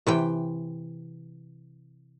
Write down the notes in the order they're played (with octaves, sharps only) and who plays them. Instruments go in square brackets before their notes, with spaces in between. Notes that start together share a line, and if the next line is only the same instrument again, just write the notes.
[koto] C3 E3 G5